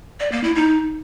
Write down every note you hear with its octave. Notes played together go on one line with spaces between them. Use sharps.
D5
A#3
E4
D#4